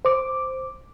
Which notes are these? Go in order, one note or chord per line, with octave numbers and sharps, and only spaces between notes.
C5 D6